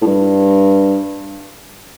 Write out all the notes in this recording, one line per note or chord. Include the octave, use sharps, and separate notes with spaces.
A2
G2